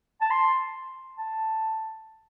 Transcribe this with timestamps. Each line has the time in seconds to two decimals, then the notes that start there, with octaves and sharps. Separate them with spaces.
0.21 A5
0.31 C6
1.18 A5